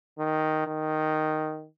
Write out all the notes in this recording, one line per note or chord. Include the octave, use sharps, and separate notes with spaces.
D#3
D#3